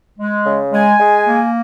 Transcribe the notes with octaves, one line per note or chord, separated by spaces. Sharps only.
G#3
C#3
G#3 G#5
G#3
A#3